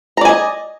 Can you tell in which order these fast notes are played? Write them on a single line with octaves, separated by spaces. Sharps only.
A#5 D5 G#5 D#5